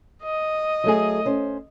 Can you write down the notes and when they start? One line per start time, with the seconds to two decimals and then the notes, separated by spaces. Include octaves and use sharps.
0.23 D#5
0.84 F#3 A3 G#4
1.25 C#4 C5